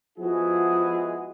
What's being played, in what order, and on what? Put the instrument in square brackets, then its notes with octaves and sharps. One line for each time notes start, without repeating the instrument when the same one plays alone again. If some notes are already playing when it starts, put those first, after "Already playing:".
[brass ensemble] F3 G#3 B3 E4 F#4 G#4